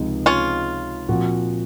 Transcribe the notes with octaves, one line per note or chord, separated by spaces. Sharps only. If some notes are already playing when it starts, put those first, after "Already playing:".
Already playing: C#2 C3 F3 G#3 D#4
C#4 F4
A#2 F3 C4 F#4